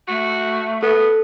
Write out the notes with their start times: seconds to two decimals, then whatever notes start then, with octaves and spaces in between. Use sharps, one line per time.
0.08 A3 F#4
0.83 B3 A4